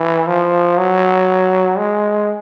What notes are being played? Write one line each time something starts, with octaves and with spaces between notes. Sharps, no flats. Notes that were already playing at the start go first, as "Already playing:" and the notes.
Already playing: E3
F3
F#3
G#3